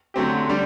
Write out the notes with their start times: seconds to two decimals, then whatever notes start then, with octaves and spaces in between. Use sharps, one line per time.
0.14 D3 F#3 A3 C4 G4
0.48 D3 G3 D4